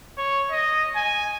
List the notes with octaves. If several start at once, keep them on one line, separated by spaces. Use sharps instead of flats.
C#5
D#5
G#5